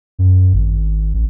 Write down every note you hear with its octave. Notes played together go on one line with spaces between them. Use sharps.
F#2
G#1
A1